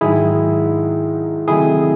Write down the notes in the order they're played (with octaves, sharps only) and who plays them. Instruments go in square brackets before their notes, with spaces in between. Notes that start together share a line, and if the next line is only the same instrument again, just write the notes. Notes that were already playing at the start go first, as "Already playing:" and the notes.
[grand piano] G#2 D#3 F#3 [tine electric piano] E4 G#4
[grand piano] C3 D#3 F#3 A3 D#4 [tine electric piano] E4 G#4